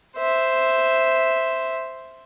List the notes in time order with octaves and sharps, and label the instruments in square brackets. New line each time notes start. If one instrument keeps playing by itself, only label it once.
[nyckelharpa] C5 E5